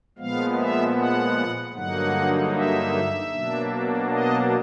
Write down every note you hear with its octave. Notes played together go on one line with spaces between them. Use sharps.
A#2 F3 G#3 B3 F5
E5
F#5
G2 D3 F#3 A#3 D#4 F#5
E5
B2 F#3 A#3 D4
D#5